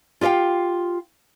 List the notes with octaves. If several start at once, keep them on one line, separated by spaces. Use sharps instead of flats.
F4 G4 D#5 F5 G5